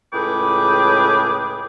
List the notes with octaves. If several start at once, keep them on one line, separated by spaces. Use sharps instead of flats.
C#2 A2 G#4 B4 G5 D6